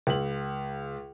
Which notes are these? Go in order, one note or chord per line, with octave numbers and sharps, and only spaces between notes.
C#2 F#7